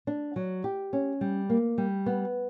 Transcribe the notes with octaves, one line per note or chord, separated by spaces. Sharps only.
D4
F#3
G4
C#4
G3
A#3
G3
B3